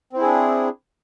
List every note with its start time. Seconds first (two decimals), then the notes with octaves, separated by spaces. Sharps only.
0.13 C4
0.17 E4
0.21 G#4
0.26 D4